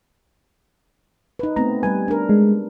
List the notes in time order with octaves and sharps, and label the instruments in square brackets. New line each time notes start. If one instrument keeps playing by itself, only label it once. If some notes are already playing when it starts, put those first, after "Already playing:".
[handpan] D#4 B4
[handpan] A3 B3 C4 [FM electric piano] A#5
[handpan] G3 B4 [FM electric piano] G#5
[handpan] D4 A#4
[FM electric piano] G#3